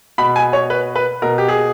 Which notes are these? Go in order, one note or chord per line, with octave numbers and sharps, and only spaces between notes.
B2 B5
G#5
C#5
B4
B4
B2 A#4
G4
G#4